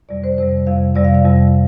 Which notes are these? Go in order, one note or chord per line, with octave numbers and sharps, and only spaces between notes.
F2 C3 G3 D5
C5
F2 C3 G3 C5
F2 C3 G3 F5
F2 C3 G3 D5
F5
F5
F2 C3 G3